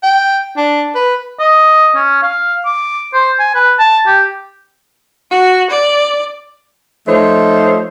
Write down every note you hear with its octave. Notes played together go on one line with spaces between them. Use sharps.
G5
D4
B4
D#5
C#4
F5
D6
C5
G#5
B4
A5
G4
F#4
D5
F3 A3 D#4 C5 C#5